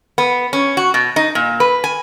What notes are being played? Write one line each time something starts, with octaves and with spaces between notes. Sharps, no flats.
B3
C#4
F#4
B2
D#4
A#2
B4
G#5